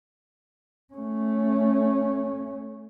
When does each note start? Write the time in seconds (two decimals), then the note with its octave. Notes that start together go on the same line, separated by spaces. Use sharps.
0.94 A3 C#4